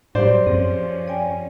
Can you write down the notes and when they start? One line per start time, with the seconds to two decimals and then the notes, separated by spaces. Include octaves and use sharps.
0.15 A2 F#3 G3 G4 C5 D5
0.47 F#2 F3 C4 C#4 G#4
1.08 D5 G5 G#5